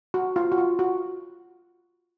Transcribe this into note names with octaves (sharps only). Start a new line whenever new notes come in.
F#4
F4
F#4
F4
F#4